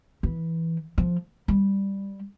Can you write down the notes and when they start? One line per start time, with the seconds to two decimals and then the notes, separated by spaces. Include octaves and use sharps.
0.23 E3
0.98 F3
1.48 G3